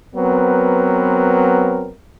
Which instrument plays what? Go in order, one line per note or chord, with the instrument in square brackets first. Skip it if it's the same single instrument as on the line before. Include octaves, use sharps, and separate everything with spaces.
[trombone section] F#3 B3 C4 A#4 B4